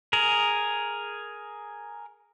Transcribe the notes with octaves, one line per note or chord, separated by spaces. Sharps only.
G#4 A#4